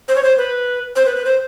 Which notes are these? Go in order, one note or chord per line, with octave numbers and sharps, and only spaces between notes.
C5
C#5
C5
B4
C5
B4
B4
C5